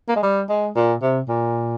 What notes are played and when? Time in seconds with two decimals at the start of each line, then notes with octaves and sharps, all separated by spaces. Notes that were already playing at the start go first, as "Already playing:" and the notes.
0.09 A#3
0.16 G#3
0.23 G3
0.49 G#3
0.76 A#2
1.02 C3
1.28 A#2